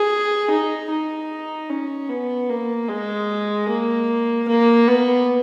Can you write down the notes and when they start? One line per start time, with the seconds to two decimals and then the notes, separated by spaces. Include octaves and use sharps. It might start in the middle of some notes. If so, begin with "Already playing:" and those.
Already playing: G#4
0.50 D#4
0.90 D#4
1.70 C#4
2.10 B3
2.50 A#3
2.89 G#3
3.69 A#3
4.48 A#3
4.88 B3